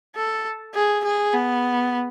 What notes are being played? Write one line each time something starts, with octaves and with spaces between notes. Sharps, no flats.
A4
G#4
G#4
B3